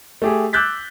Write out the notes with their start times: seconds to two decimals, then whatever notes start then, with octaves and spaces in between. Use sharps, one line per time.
0.22 A3 G4 G#4
0.53 D6 E6 F#6 G6 A6 B6